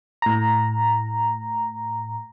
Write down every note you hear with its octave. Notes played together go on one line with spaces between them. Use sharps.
A2 A#5